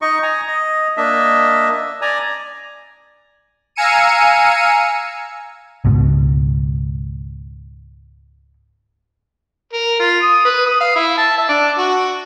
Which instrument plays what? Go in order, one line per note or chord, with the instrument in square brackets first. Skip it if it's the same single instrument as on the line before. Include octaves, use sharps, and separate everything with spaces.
[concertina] D#4 D#5 C#6
G#5 A#5
D#5
A#3 D4 D#5 E5
D5 G#5 A#5
[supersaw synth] F5 G#5 A#5 E6 C#7 D#7
[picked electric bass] C#2 G#2 B2
[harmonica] A#4
F4
D#6
B4
D#6
F5
E4
A5
E5
D4
F#4